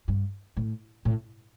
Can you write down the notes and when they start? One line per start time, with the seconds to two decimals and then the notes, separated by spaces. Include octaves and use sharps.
0.08 G2
0.57 A2
1.05 A2